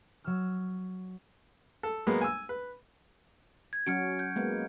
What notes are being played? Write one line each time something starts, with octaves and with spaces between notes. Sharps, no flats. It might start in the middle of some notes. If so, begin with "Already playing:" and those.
F#3 E6 F6
A4
F#3 G#3 A#3 B3
G#5 E6
B4
G#6
F#3 C#4 F#4 F6 C#7 D7
G6
G#3 A#3 B3